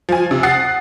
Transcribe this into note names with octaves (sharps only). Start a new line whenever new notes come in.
F3 G#5
C3
F#5 D#6 A6 C7